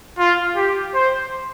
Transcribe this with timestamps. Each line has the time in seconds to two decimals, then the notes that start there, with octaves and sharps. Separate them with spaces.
0.19 F4
0.56 G4
0.94 C5